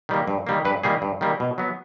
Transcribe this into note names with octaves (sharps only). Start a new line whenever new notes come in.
D#3 G3 A#3
G2
D#3 G3 A#3
G2 B4
D#3 G3 A#3 G#4
G2
D#3 G3 A#3
B2
F#3 B3